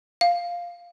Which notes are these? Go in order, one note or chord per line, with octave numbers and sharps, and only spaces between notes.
F5